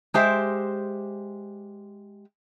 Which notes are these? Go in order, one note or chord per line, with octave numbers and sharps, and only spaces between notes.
G#3 G4 C5 E5